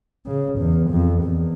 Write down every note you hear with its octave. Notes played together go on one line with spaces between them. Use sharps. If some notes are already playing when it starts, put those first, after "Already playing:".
C#3
E2
F2
E2